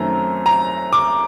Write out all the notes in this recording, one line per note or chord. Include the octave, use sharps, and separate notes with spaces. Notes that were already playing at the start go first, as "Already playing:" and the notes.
Already playing: F#2 D#3 F#3 A3 C4 A#5
A#5
D6